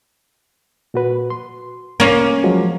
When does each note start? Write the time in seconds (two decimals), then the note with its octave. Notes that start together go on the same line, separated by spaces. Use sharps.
0.94 A#2 F#4 B4
1.30 C6
2.00 C2 A#3 C#4 A#4
2.44 F3 F#3 G#3